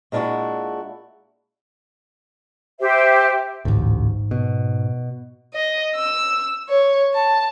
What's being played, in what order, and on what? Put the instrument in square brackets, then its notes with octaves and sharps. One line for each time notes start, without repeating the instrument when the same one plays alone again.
[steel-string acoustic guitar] A#2 G#3 D4 E4 F#4
[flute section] G4 C5 E5
[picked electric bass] A1 D2 [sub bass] G#2
[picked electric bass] B2
[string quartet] D#5
E6
C#5
A5